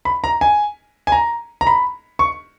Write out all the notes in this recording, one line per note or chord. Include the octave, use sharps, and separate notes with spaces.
B5
A#5
G#5
G#5
A#5
A#5
B5
C#6